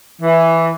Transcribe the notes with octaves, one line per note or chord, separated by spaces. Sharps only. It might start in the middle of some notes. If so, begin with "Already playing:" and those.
E3